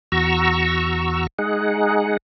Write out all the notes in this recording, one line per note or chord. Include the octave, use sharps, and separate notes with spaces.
E2 F#4 A#5 C#6 E6
G#3 D#4 G#4 F#5